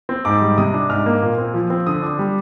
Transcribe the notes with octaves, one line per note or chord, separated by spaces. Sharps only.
C4
G#2 D6
G3
C3 D#6
D4
G#2 F6
A#3
A#2
C4
F3
C4
D3 D#6
D4
G3